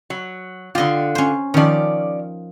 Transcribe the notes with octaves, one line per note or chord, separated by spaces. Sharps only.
F#3
D3 F4 G4 D#5
C#4 C5
D#3 F3 C#4 D5